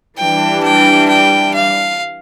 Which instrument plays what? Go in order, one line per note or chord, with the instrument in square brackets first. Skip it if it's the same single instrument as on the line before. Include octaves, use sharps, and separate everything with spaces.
[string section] E3 G3 D4 [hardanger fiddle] G5
[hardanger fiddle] G5
G5
F5